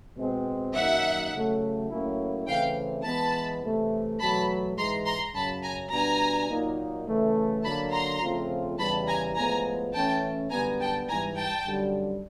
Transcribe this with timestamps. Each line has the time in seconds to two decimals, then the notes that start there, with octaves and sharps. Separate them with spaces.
0.17 B2 G#3 C4
0.74 F#2 D#3 F#3 A#3 D#4 E5 F#5
1.32 C#3 F#3 A3
1.90 A2 F#3 A#3 C#4 E4
2.47 C#3 E3 A3 C4 F5 G5
3.05 E3 G#3 B3 A5 B5
3.62 C3 E3 A3
4.19 E2 B2 F#3 A3 A5 B5
4.76 G#2 E3 G#3 A#5 C6
5.05 A#5 C6
5.34 F#2 C#3 F#3 A5 B5
5.62 G#5 A#5
5.91 B2 G3 B3 D4 G#5 A#5
6.49 A#2 F#3 A#3 D#4
7.06 C#3 E3 A3
7.63 D3 F#3 A#3 A5 B5
7.92 A#5 C6
8.21 C#3 F3 A3 C4 F4
8.78 E2 C#3 E3 G3 A5 B5
9.07 G#5 A#5
9.35 A2 F3 G#3 B3 G#5 A#5
9.92 E3 A3 C#4 E4 G5 A5
10.50 F#2 D3 G3 B3 G#5 A#5
10.79 G5 A5
11.08 G#2 E3 G3 G#5 A#5
11.37 G5 A5
11.65 F#2 D3 G3